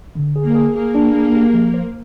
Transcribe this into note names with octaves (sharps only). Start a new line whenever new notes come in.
D3
G#4
A#3
G#4
A#3 G#4
D4
G#4
G4
F3
C5